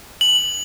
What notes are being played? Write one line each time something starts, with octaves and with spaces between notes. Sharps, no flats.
F#7